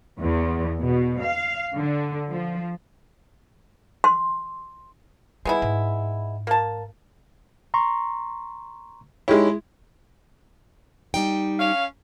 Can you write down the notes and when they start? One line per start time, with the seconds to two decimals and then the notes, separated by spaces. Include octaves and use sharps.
0.20 E2
0.83 B2
1.23 F5
1.75 D3
2.30 F3
4.04 C6
5.45 G3 G#3 B3 E4
5.62 G#2
6.47 A#3 A5
7.74 A#5 C6 C#6
9.28 G#3 D#4 E4 G4 C#5
11.14 G3 D#4 G5
11.60 C#4 F5